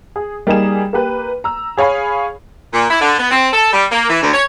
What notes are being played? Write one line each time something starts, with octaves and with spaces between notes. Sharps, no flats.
G#4
G3 A#3 D#4 G#4 E7
A#3 G4 B4
A#5 E6
G#4 C#5 F5 G#5 B5
A#2
E4
D3
B3
C4
A4
G3
A#3
E3
D2
C#5